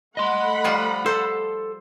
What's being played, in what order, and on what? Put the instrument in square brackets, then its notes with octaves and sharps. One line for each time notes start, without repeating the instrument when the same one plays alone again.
[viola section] A3 F#5 B5 [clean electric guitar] D#5 C6
[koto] F3 G3 F4
[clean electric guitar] A4 [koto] C5